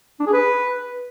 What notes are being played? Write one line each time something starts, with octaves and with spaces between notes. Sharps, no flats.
D4
G#4
B4